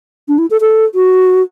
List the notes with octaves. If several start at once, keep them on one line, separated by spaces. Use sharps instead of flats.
D4
E4
A4
A4
F#4